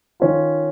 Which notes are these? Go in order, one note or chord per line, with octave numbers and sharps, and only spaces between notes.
D#3 C#4 F4